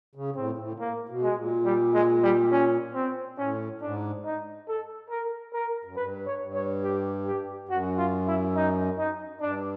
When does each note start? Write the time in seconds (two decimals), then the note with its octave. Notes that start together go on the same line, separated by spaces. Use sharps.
0.15 C#3
0.36 A2 C4
0.58 A2
0.80 A#3
1.09 B2
1.22 G#3
1.36 A#2
1.65 G3
1.94 G#3
2.23 G3
2.51 C#4
2.94 C4
3.38 A2 C#4
3.81 G#2 D4
4.25 D#4
4.68 A4
5.10 A#4
5.53 A#4
5.85 F#2
5.96 G2 B4
6.26 C#5
6.41 G2
6.54 C#5
6.84 G4
7.26 G4
7.69 F#2 F#4
7.98 F4
8.27 E4
8.55 D#4
8.98 D#4
9.41 G2 D4